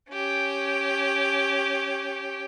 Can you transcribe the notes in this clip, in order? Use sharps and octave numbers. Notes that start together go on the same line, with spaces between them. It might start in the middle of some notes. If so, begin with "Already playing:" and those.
C#4 G4